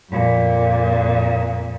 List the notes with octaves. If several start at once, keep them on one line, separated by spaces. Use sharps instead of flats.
F2 A#2